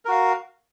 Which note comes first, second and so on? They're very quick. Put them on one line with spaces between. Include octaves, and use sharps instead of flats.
A#4 F#4 F5